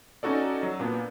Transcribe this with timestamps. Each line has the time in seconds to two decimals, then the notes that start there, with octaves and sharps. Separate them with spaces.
0.23 C#4 D#4 F#4 A4 D5
0.63 F#3
0.80 A#2 B3 D4